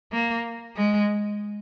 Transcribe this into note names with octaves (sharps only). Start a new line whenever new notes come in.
A#3
G#3